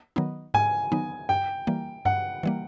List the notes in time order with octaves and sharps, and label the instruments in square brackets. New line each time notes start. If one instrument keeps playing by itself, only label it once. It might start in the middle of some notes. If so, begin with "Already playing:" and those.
[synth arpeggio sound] D#3 F#3 B3 D#4
[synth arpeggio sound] G#2 [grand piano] G#5
[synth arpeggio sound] D#3 F#3 B3 D#4
[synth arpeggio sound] G2 [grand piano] G5
[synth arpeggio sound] E3 G3 A#3
[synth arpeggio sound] G2 [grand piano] F#5
[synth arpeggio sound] E3 G3 A#3